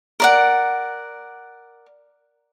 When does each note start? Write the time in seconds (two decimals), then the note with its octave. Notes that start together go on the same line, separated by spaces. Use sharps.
0.20 A#4 D5 F#5